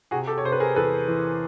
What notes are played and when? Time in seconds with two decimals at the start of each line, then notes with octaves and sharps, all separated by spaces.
0.11 C3 F#4 G#4
0.27 G4 A4
0.38 C#5
0.44 C3 C5
0.52 B4
0.60 G#4 A#4
0.76 E2 A4 B4
1.08 E3